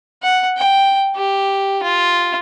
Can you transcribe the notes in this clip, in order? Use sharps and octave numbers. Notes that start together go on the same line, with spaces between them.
F#5
G5
G4
F4